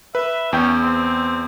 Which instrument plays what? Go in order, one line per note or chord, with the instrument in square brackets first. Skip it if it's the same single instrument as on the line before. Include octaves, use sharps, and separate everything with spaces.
[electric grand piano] B4 [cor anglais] E5
[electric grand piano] E2 G5 G6 [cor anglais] C#4
[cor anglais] C4